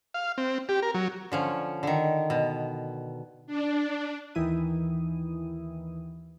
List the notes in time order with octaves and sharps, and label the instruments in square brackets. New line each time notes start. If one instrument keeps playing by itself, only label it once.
[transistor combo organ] F5
C4
G4
A#4
F#3
[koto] D3 F3 C#4
D3 D#3
B2
[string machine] D4
[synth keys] D#2 D#3 E3 E4 D#6